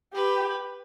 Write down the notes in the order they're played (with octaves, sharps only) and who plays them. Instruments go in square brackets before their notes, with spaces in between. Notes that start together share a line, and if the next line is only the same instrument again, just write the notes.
[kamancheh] G4 [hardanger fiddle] B4